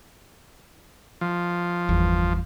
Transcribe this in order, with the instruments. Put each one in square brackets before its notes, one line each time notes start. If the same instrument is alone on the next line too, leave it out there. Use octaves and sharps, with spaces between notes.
[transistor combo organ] F3
[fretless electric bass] G1 E2